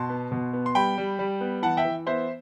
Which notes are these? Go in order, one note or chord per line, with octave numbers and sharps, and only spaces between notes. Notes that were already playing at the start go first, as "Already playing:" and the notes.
Already playing: B2 A5 C6
B3
B2
B3
C6
G3 G5 B5
G3
G3
B3
E3 F#5 A5
E5 G5
E3
B3 C5 E5